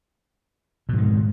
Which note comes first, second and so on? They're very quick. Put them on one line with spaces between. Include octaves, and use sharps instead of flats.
B2 G#2 D#3